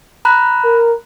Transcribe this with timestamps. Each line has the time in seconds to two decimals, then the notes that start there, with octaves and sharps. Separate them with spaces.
0.25 A#5 B5 F#6
0.64 A#4